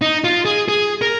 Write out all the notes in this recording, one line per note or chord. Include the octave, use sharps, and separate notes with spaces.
D#4
F4
G#4
G#4
A#4